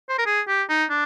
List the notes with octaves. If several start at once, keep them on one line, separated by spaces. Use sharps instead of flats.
C5
A#4
G#4
G4
D#4
D4